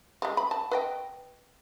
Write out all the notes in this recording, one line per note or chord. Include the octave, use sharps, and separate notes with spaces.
G3 G#3
B5
A5
B4 D#5 G5